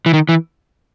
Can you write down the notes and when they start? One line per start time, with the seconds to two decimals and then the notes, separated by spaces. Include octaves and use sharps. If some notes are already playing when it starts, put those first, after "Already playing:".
0.06 E3
0.14 D#3
0.29 E3